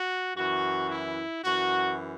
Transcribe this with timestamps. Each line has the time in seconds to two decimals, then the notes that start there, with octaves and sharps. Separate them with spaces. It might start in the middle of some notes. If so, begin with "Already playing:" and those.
Already playing: F#4
0.37 F#2 E3 F#4
0.91 E4
1.44 F#2 E3 F#4